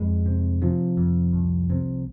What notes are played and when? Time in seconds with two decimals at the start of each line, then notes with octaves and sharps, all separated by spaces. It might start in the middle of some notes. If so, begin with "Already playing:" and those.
Already playing: F2 G#3
0.26 C3
0.62 C3 F3
0.97 F2
1.33 C2
1.70 C3